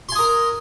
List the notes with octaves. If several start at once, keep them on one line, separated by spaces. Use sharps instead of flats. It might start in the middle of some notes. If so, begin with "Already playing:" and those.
A#4 G#5 C6 D#6